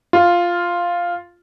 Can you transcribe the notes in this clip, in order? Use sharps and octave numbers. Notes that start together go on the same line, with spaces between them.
F4